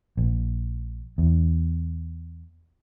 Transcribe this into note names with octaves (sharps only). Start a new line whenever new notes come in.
A#1
E2